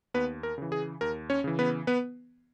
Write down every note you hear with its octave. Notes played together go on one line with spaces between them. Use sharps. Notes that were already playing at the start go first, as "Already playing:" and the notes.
D#2 B3 B4
A#4
C#3 E3
G#4
D#2 A#4
C#4 C#5
C#3 E3
B3 B4
B3 B4